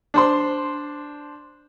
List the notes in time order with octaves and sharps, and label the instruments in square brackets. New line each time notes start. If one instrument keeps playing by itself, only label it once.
[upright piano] D4 C5 C6